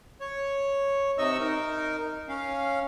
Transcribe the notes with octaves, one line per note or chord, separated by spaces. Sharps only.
C#5
C3 D#4 D#5 C#6 E6
D#4 A#4
C#4 F5